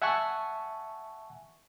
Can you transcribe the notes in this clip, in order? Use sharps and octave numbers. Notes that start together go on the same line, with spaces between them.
E5 F#5 G#5 A5 C#6